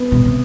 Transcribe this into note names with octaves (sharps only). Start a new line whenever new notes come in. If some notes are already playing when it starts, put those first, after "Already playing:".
Already playing: B3
B2
C3